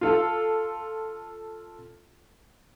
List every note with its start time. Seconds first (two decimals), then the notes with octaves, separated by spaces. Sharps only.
0.01 F4 A4 F5